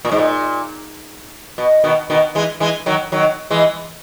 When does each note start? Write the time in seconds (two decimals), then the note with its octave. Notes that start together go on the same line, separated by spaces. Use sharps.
0.05 A#2
0.12 G#2
0.18 A#2
1.58 B2
1.84 B2 D#3
2.10 B2 D#3
2.35 E3 G#3
2.60 E3 G#3
2.86 D#3 F#3
3.12 D#3 F#3
3.51 E3 G#3